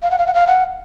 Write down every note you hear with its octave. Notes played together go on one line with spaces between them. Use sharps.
F5
F#5
F5
F#5
F5
F#5